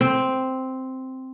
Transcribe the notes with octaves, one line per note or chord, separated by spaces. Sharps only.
C4